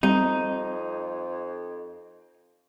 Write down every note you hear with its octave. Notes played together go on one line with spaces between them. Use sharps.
F2 G3 C4 D#4